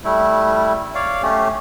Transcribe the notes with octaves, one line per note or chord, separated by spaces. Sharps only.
G3 A3 E4
C#5 D5 F5
A3 C#4 G4